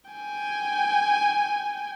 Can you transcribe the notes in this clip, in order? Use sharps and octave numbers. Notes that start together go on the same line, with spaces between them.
G5 G#5